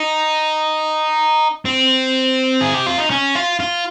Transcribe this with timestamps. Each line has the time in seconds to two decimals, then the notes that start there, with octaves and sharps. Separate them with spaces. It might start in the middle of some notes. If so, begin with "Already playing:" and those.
Already playing: D#4
1.65 C4
2.61 G#4
2.74 G4
2.86 F4
2.98 D#4
3.10 C#4
3.35 F4
3.60 F4